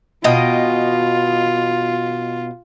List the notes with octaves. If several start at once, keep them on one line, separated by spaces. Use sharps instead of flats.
B2 F4 D#5 G5